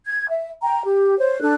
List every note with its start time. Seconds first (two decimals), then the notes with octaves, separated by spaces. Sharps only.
0.05 G#6
0.29 E5
0.63 G5 A#5
0.84 G4
1.18 C5 C#5
1.41 D4 A4 F#6